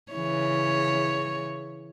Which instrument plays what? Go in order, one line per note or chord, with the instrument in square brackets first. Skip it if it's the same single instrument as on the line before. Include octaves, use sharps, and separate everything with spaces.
[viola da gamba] C#3 E3 C#5